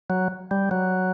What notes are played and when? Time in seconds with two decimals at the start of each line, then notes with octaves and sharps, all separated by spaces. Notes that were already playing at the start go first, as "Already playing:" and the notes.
0.10 F#3
0.51 G3
0.71 F#3